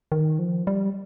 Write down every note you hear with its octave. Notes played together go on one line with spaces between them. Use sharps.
D#3
F3
G3